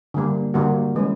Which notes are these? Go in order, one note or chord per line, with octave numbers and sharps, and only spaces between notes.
D3 G3 A#3
D3 G3 A#3 F#4
E3 G#3 C#4